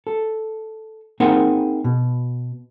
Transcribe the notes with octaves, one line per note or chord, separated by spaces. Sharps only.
A4
A#3 C4 D#4 G#4 A#4 F#5
B2